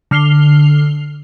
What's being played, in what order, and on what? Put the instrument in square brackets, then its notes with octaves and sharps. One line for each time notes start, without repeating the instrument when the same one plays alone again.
[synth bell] D3 F6 C7 F7 G7